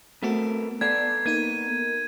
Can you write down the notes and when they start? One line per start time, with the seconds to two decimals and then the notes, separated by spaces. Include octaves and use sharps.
0.23 A3 B3 C4 F#4 A4 A#4
0.81 B3 A4 D5 D6 G#6 C7
1.26 A#3 D#4 A#4 G#6 D#7